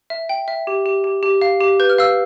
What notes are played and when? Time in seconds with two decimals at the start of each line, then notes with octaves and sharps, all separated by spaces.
0.10 E5
0.29 G5
0.48 E5
0.67 G4
0.86 G4
1.04 G4
1.23 G4
1.42 F5
1.60 G4
1.80 B4 G6
1.89 F6
1.98 F5 E6